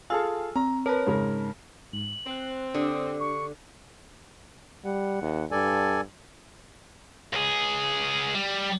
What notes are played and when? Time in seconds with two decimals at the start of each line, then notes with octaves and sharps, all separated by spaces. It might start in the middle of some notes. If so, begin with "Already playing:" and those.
0.10 F4 G#4 A4 G#5 E6 F6
0.56 C4 A#5
0.86 A#4 B4 C#5 A5
1.07 G#2 C#3 A#4
1.93 G#2 F#7
2.27 C4 C5 F#6
2.74 D3 D4 G4 D#6
3.20 C#6
4.85 G3 F#5
5.22 D#2
5.51 G2 A4 D5 G#5
7.33 C#2 G#4
8.35 G3